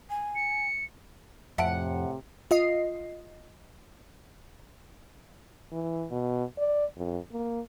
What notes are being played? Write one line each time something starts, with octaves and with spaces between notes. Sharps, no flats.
G#5
C#7
F2 A2 C3 E5 F#5 A5 D7
F4 D#5 C7
E3
B2
D5
F2
A#3